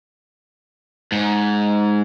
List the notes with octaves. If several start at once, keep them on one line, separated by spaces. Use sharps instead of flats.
G#2